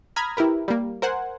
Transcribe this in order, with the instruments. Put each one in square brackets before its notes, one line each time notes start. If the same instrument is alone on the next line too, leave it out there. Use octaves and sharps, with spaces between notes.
[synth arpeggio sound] A#5 B5 D#6 F6 G#6 A#6
E4 G4 A#4 B4
G3 A#3
A#4 C5 F#5 G#5